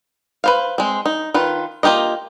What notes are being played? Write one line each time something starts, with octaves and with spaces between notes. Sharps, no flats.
B4 C5 F5
G#3 C4
D#4
D#3 F4 B4
A#3 F4 G4 A#4 D#5